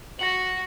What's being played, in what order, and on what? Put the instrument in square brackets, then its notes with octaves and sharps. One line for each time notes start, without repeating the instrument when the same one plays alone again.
[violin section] F#4 [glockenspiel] A#6 C#7 F#7